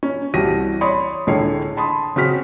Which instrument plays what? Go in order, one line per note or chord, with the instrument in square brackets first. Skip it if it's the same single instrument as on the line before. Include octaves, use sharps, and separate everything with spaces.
[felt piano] C#4
C2 E3 F#4 G4 A#6 D#7
C#5 D5 B5 C6 D#6
C#2 A2 D3 G#4 C#5 C7
A5 B5 C6 D#6
C#3 C4 F#4 C#5 F6 B6